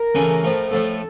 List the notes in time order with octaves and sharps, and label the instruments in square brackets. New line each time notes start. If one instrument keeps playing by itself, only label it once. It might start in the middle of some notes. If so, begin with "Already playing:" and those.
Already playing: [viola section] A#4
[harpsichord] C#3 E3 A3 C#4 E4
A2 F3 A3
[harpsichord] A2 F3 A3 [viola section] A4